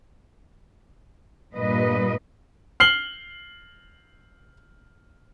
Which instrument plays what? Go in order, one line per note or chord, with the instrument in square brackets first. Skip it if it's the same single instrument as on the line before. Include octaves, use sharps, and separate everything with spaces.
[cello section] G2 A#2 G3 B4 D#5
[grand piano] F6 C7 F#7 G7